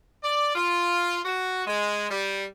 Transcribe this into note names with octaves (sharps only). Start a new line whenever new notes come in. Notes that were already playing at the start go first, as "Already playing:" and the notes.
D5
F4
F#4
G#3
G3